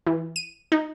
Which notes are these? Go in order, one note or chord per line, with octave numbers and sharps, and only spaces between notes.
E3
D#7
D#4